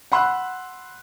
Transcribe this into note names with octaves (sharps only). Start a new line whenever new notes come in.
F#5 B5 C6 E6 F#6